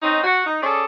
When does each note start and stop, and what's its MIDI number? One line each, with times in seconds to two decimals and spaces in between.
0.03 0.24 60
0.03 0.24 61
0.03 0.24 63
0.24 0.43 66
0.47 0.61 63
0.62 0.85 61
0.62 0.85 68
0.62 0.85 69
0.62 0.85 74